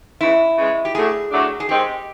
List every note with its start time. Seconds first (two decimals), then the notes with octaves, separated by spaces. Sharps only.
0.21 C#3 E3 G#3 E4
0.58 C#3 E3 G#3
0.85 G4
0.95 A2 F#3 A3 D4 G#4
1.32 A2 F#3 A3 D4
1.60 G#4
1.69 D#3 G#3 C4 G4